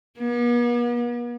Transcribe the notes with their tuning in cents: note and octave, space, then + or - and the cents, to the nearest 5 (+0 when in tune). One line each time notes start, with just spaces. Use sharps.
B3 -45